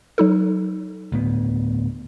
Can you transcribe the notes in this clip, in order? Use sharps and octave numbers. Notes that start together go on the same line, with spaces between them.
F#3 D#4 A4
D2 A2 B3